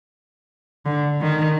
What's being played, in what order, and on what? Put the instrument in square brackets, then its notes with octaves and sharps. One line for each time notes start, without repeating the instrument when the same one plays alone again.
[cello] D3
D#3